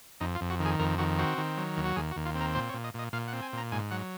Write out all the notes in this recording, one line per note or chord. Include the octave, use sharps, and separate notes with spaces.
F2 D#4
F4
F2
F#4
D#3
G#4
F2 A#4
D#3 F#4
C4 F#4
D#3
F#3
D#2
F#4
D#2 G#4
F#4
D#2
F4
C4
A#4
A#2 C5
C#5
A#2
D#5
A#2 D#5
A#2 F5
F#5
C4
G#5
A#2 A#5
G#2 G#5
F#3 F#5